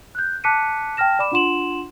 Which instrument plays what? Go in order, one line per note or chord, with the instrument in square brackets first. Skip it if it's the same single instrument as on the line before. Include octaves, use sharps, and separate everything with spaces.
[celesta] F#6 G6
A5 D6 F#6 B6 C#7 D#7
G5 A5 F6 A#6 E7
D5 B5 D6 E7
D4 F4 F#5 C6 E7 F#7